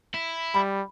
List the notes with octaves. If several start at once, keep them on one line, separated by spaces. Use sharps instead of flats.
E4
G3 B5